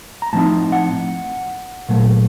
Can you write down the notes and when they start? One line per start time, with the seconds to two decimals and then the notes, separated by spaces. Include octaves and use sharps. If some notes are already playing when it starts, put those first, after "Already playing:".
0.22 A#5
0.33 A2 F3 C4 D#4 A5
0.72 F#5
1.89 A#2 F#3 A3